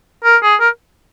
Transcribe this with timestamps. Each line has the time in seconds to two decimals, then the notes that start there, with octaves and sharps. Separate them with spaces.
0.24 A#4
0.43 G#4
0.60 A#4